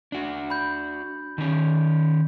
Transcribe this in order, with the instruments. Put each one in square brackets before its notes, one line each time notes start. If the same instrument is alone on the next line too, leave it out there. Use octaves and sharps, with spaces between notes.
[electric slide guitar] D4 F#4
[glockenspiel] B5 G6
[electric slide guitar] D#3 C#4